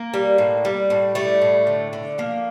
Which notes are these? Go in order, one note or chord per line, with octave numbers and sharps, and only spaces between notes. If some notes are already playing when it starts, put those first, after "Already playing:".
Already playing: A#3
G3
A2
G3
A2
G3 A3
A2
D3
D3
F3 A#3